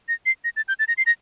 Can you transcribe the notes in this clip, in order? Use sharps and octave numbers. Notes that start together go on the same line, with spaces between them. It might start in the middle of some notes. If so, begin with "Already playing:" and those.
A#6
C7
A#6
A6
G6
A6
A#6
C7
A#6